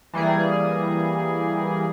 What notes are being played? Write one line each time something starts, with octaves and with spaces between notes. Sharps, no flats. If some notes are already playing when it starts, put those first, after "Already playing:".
E3 G3 A#3 G#4